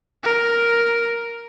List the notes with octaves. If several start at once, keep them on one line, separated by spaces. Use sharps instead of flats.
A#4